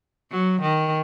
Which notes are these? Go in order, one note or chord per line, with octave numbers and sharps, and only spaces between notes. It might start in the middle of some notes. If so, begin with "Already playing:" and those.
F#3
D#3